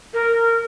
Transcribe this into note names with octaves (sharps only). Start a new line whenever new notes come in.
A#4